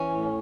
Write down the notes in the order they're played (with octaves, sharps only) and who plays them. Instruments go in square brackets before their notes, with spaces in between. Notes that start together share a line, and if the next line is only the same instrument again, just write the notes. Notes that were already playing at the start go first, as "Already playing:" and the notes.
Already playing: [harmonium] E3 [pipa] C#4
[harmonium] A2